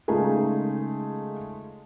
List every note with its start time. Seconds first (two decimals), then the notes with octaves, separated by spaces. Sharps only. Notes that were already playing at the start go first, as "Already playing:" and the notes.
0.08 C#3 G#3 A3 D#4 F4 G#4